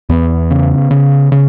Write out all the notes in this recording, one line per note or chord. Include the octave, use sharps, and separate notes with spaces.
E2 B3
C#3
C#3
C#3